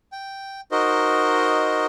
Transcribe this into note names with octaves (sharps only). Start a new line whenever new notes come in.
G5
D#4 F#4 A#4 C5 D#5